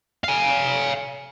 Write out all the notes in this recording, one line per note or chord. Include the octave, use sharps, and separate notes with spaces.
F5 G#5